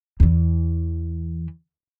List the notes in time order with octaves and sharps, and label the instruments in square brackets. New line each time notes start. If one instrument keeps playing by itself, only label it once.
[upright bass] E2 E3